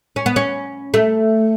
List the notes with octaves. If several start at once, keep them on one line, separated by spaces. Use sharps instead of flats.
C#4
B3
C#4
A3